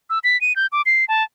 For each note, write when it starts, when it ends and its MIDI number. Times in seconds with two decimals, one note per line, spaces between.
0.10 0.19 88
0.24 0.39 95
0.41 0.56 99
0.56 0.67 91
0.72 0.82 86
0.86 1.05 96
1.08 1.23 81